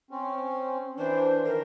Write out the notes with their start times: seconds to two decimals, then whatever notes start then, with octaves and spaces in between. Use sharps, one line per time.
0.11 C4 C#4
0.98 E3 D4 C5
1.45 D#3 A#4